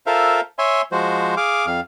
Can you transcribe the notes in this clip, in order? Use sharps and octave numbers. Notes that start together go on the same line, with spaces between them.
F4 A4 A#4 C5 E5 F5
C#5 E5 G#5 C6
F3 G#3 F#4 C5
G#4 F5 D6
F2 F5